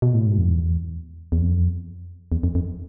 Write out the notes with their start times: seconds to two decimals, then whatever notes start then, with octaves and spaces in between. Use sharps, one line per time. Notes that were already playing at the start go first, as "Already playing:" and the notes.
0.02 B2
0.14 A2
0.26 G#2
0.38 F2
0.50 E2
1.32 E2
1.41 F2
2.32 E2
2.43 F2
2.55 F2